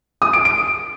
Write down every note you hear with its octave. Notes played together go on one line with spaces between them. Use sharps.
D#6
D7
D7